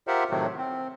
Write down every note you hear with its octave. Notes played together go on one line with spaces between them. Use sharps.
F4 G4 A#4 C5 E5 F#5
A2 C3 D#3 F#3 A3
C4